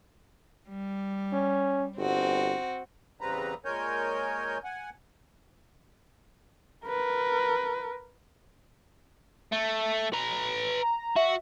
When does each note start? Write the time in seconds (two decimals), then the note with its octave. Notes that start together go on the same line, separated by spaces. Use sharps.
0.68 G3
1.33 C#4
1.98 G1 C4 F#4
3.21 E2 C#3 G3 C4 B4 A#5
3.65 A#2 G#3 A#4 C#5 G#5 G6
4.64 F#5 G#5
6.86 A#4 B4
9.52 A3
10.13 B4 A#5
10.82 A#5
11.16 F#4 E5